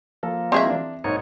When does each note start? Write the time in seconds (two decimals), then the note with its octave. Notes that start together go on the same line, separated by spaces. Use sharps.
0.23 F3 A#3 A4
0.52 G#3 C4 G#4 D#5 E5 C#6
0.65 E3 D4
1.04 B1 G#2 A#3 D#4 C#5